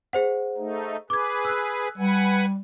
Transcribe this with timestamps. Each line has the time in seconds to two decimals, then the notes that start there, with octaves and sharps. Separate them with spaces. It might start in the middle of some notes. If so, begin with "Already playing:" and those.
0.13 G#4 C5 F#5
0.57 A3 D#4
1.10 G#4 B4 D6 G#6
1.45 E6 F#6
1.98 G3 B4 F#5 G#5